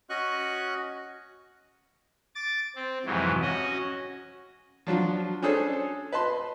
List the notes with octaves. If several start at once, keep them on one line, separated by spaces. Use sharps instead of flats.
C#4 F#4 D#5 C#6 F#6
D6 A6
C4
F2 G#2 C3 E3 F#3
C#4 F#4 D#5
F3 F#3 D4 F4
C#4 D4 G#4 A4 C5 C#5
B4 D#5 A5 C6